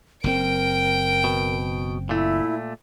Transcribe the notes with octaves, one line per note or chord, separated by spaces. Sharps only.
F#1 A2 C4 A#4 G5 D7
B2
A#2 A3 E4